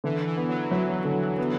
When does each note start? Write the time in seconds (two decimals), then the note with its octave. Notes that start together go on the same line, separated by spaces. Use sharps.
0.04 D3 E3
0.27 E3
0.37 B3
0.49 F#3
0.71 E3 F#3
1.05 D3
1.38 B3